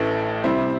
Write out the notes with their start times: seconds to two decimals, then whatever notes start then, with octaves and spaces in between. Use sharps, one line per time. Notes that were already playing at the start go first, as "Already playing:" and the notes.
Already playing: A1 A2 E3 A3
0.44 C3 G3 C4 E4